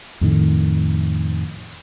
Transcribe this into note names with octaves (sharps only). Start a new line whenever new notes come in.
F2 A2 D#3